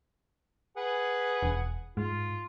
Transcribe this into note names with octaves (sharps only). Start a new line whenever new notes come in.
G#4 B4 F#5
E1
G#2 F4